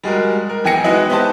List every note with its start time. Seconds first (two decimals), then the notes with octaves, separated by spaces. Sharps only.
0.04 G3 G#3 F#4 A#4
0.49 A#4
0.64 E1 E3 G5 G#5 A#6 C#7
0.84 G#3 B3 D#4 E4 F#4
1.10 B3 D#4 G4 C5 A5